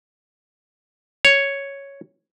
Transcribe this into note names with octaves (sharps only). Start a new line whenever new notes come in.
C#5